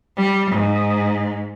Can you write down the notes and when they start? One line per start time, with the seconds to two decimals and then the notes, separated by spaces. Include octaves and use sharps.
0.17 G3
0.51 G#2